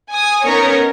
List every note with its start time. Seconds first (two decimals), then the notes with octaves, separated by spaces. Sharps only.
0.12 G#5 D#6
0.44 B3 C#4 D#4 A#4 C#5